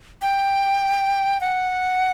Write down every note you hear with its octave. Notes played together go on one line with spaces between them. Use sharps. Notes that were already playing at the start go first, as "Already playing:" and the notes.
G5
F#5